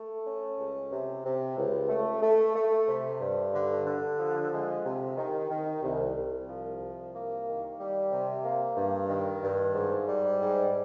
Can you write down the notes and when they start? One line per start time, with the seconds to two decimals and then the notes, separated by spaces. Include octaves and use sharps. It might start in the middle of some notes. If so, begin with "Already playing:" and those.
Already playing: A3
0.25 C#4
0.58 C#2
0.91 C3
1.24 C3
1.57 C#2
1.89 A3
2.22 A3
2.55 A3
2.88 C3
3.20 G2
3.53 D3
3.86 D3
4.18 F3
4.52 G#3
4.84 C3
5.17 D#3
5.50 D#3
5.82 C2
6.15 C2
6.48 F3
6.80 C2
7.14 A#3
7.46 D#3
7.79 G3
8.11 C3
8.44 A#3
8.76 G2
9.09 D#3
9.42 G2
9.74 G#2
10.08 G3
10.40 G#2